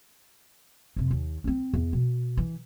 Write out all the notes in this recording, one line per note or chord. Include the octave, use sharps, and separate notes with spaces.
F2 C3
D#2
C4 C#4
E2
B2
E3